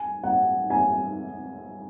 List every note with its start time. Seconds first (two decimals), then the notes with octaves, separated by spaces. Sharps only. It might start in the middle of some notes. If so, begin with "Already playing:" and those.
Already playing: G#5
0.23 F#5
0.70 G#5